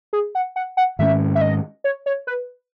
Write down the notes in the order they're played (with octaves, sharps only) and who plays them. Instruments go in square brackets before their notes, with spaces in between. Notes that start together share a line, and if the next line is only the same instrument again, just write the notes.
[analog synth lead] G#4
F#5
F#5
F#5
[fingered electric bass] G#2 D#3 G#3 C#4 [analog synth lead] E5
[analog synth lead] E5
D#5
C#5
C#5
B4